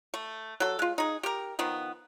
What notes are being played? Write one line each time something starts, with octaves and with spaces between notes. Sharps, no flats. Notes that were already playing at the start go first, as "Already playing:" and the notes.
A3
F#3 A4
G#3 F4
D#4 G#4
G4 A#4
D#3 F3 B3